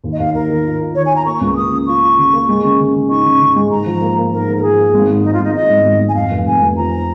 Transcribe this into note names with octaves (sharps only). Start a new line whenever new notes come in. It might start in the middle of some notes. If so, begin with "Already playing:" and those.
D#2
D#5
D#2 F5
D#2 A#4
D#3
F4
F4
D#3 C#5
G#5
F4 A#5
A#3 C#6
C#2
C#6
A#3 D#6
C#3
F4 C#6
F4
C#3
A#3
G#3
C#3
C#3
C#3
D#4 C#6
C#3
C#3
G#3
G#2 A#5
F3
A#3
A#3
G#2 A#4
G#2
A#4
F3 G#4
A#3
G#1
G#2
G#2 D#4
F4
G#1
D#4
G#2 D#5
G#1
G#1
G#1
G#5
F1 F5
F1
F1 G#5
F1
F3 A#5